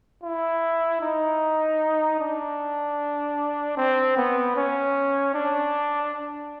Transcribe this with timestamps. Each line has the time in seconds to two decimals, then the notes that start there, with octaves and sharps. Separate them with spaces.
0.23 E4
1.01 D#4
2.20 D4
3.77 C4
4.17 B3
4.56 C#4
5.34 D4